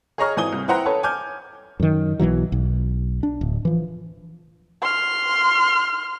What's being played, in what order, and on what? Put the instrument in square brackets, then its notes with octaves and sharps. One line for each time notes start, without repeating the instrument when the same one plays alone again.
[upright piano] G#4 C#5 D#5 A#5 C#6 F6
G#1 E3 G#5 D#6 G7
C2
E4 B4 C5 F#5 G5 A#5
C#4 A4 B4 C#5 A5
G#5 D6 F6 G6
[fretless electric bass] F#2 D#3
B1 B2 E3 F#3
B1
D4
D1
E3 F3
[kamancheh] C6 F6